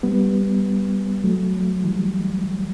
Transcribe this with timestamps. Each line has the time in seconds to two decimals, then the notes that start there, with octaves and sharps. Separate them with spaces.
0.03 G3 B3
1.24 F#3 A3
1.84 E3 G3